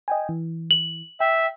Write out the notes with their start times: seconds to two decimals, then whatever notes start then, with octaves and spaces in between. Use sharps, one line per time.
0.08 D#5 G5 G#5
0.29 E3
0.71 F#7
1.20 E5 G5